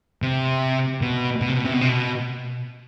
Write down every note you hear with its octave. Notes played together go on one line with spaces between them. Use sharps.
C3
B2
B2
C3
B2
C3
B2
C3
B2